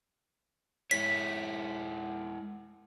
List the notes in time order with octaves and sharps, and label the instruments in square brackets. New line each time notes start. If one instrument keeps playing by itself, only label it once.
[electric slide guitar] G#3 E4 C#5 [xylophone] B6